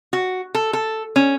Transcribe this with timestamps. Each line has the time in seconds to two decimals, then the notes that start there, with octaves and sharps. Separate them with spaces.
0.13 F#4
0.55 A4
0.73 A4
1.16 C#4